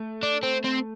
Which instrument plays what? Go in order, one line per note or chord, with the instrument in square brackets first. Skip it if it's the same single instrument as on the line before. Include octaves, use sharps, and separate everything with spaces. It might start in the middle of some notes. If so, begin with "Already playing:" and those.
Already playing: [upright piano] A3
[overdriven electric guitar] D4
C4
C4